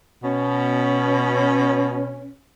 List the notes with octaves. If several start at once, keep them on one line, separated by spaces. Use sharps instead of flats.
B2 C#4